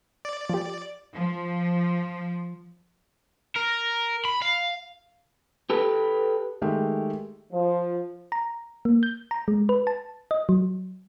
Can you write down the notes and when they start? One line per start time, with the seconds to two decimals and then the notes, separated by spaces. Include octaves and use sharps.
0.25 D5
0.49 F3 G4
1.14 F3
3.56 A#4
4.25 B5
4.42 F5
5.70 G4 A4 B4
6.62 D#3 G#3 A3 G4
7.52 F3
8.32 A#5
8.85 A#3
9.03 G6
9.31 A#5
9.48 G#3
9.69 B4
9.87 A5
10.31 D#5
10.49 F#3